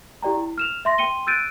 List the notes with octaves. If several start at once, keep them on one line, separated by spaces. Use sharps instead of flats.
E4 G4 D5 G5 A#5
E4
F6 E7 F7
E5 C6 A#6
G5 C6 C#7 D#7 G7
E6 F#6 G6 A6 D7 D#7